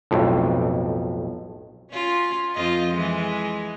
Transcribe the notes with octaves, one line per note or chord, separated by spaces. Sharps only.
B1 F2 A2
C#4 F4
F2 F4 D#5
E3 G#3